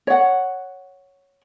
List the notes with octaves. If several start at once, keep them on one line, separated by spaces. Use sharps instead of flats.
C#5 F#5